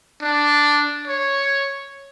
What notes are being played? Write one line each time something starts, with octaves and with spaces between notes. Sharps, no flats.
D4
C#5